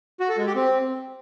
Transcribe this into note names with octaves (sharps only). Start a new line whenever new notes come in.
F#4
A4
G#3
G4
C4